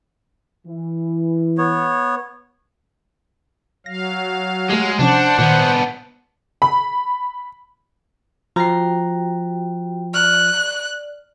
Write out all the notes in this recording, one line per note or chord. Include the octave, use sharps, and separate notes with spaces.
E3
B3 C#5
F#3 F5 A#6
G#3 A3 G4
C3 F3 C#4 D4 C5 F#5
A#2 D#3 B3 D4
B5
F3 F#4 G5 A#5 C7
D5 F6 F#6